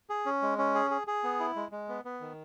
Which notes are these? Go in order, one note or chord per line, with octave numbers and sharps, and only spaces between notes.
G#4
C#4
G#3
C#4
G#4
G#4
G#4
B3
E4
G#3
G#3
B3
B3
D#3